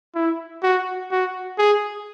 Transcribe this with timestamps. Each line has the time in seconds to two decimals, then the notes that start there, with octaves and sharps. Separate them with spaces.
0.15 E4
0.63 F#4
1.11 F#4
1.58 G#4